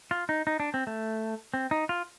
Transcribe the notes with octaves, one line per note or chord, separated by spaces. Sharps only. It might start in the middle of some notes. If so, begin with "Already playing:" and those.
F4
D#4
D#4
D4
C4
A3
C4
D#4
F4